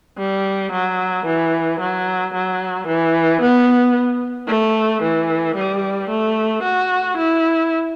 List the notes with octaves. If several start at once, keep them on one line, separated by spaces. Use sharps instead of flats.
G3
F#3
E3
F#3
F#3
E3
B3
A3
E3
G3
A3
F#4
E4